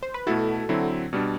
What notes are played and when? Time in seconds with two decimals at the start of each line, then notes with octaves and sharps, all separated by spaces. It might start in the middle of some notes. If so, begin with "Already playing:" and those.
0.03 C5
0.14 B4
0.27 B2 A3 E4 F#4 A4
0.69 D3 F#3 C4 E4
1.13 B2 G3 D4